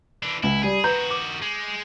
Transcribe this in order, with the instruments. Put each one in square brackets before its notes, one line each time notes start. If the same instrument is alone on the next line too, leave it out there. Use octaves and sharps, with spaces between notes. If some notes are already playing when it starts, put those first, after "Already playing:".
[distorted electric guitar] E3 D4
[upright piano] C#2 [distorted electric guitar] E4
[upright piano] G3 [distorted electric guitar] G#4
[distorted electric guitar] D#3 F#4 [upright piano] B4 A#5 G6
[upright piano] D6
[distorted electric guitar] G#3